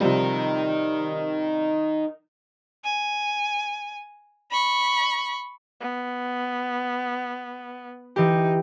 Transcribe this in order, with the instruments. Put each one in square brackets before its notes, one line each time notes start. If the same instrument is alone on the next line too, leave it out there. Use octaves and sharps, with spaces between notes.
[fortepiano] C3 F3 G3 [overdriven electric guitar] D#4 A#4
[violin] G#5
B5 C#6
[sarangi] B3
[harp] E3 G4 [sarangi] D#4